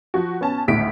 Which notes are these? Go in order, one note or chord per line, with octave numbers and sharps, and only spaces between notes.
F3 F#4
B3 C#4 A5
G#1 D2 A2 B6 D7